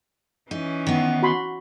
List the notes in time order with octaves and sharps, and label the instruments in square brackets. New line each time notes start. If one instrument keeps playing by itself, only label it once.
[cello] E3 C#4 [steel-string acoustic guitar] D#4
[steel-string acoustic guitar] D#3 B3
[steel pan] F#4 B5 C6